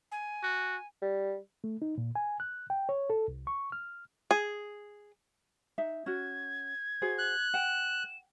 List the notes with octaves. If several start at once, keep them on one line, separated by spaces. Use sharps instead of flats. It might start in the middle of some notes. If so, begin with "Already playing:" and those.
G#5
F#4
G3
A3
D#4
A#2
G#5
F#6
G5
C#5
A4
C2
C#6
F6
G#4
D#4 E5
C#4 F#4 G#6
F#4 G#4 C5
F#6
F#5 G5 E7